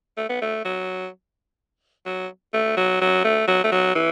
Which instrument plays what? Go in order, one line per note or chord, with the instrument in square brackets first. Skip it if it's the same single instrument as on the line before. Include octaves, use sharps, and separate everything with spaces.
[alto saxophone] A3
B3
A3
F#3
F#3
A3
F#3
F#3
A3
F#3
A3
F#3
E3